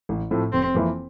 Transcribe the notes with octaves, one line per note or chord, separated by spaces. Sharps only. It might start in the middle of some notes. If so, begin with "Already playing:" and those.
A1
A2 F3 A3 C4
F1 C4
F2 E3 A#3 E4